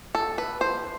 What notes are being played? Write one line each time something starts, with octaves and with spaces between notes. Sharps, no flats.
A4
B4
C5